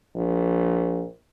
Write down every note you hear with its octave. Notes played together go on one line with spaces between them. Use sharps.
A#1